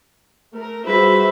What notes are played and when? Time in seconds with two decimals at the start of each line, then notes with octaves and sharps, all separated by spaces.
0.55 A3 A#4
0.87 G3 F4 F#4 G#4 B4 C5 E5 B6